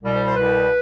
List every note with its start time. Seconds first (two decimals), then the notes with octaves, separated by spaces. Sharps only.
0.02 C2 B2 G3
0.14 C5
0.26 C5
0.36 C2 B2 G3 B4